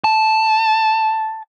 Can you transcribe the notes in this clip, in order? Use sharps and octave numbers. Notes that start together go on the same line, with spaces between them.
A5